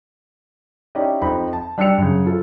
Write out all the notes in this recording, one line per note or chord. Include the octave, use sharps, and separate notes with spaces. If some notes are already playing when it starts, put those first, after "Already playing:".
C#4 D#4 E4 G4 D5 D#5
F2 C4 D#4 B5
A5
G3 D4 G5 E6 C#7 F7
F#2 C#3
F3 F4 A4